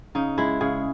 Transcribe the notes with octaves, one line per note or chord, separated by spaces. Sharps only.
C#3 D#4
G#3 E4
C#3 G#4